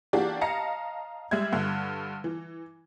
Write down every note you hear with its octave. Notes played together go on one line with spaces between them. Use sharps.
E3 A#3 D4 F#4 G4
D#5 F5 A5 A#5 A#6 C#7
G3 G#3 E5 G#6
G2 D3
E3